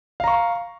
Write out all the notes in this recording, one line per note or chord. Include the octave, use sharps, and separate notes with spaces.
F5 A#5 C#6